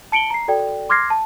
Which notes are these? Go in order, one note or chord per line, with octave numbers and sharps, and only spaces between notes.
A5 C#7 D7 F#7 G7
A#5 C7
F#4 A4 D5 G5
C6 D6 F6 G#6 A#6 C7
A5